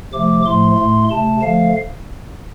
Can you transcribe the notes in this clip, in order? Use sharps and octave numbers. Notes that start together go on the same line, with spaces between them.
C3 F3 A3 D6
A2 F3 A3 C6
A2 A3
C3 A3 A5
D3 F3 A3 F5